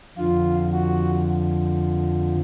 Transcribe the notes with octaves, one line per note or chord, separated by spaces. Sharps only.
F2 D3 F3 F4
F#4